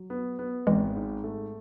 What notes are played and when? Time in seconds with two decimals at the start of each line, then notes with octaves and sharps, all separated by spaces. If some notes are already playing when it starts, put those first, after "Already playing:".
Already playing: F#3
0.10 B3
0.39 B3
0.67 G#1 E3 G#3
0.96 G#2
1.24 A3